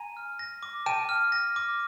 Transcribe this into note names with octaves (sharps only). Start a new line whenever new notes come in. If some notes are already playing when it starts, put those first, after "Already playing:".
Already playing: G#5 A#5 D#7
F6
A#6
D6
G5 A5 D#7
F6
A#6
D6